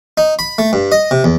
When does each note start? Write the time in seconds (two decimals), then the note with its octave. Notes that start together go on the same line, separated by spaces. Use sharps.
0.18 D#4
0.39 B5
0.58 A3
0.73 G2
0.92 D#5
1.11 C3
1.24 E2